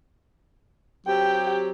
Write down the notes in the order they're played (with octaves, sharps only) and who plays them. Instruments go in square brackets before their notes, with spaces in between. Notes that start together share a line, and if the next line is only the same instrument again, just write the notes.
[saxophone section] F#3 C4 G4 [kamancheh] G5